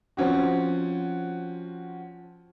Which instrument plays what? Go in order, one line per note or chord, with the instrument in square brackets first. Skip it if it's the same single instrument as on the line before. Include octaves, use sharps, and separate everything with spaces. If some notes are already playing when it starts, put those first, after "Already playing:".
[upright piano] F3 C4 C#4 F#4